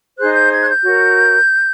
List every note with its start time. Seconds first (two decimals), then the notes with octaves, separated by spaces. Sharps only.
0.18 D#4 G#4 C5 F#6
0.34 G6
0.52 G#6
0.61 F#6
0.68 G6
0.84 F#4 A#4 C#5